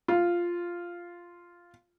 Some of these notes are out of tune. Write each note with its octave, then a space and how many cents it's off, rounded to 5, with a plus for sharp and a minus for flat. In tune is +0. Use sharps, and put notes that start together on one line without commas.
F4 -5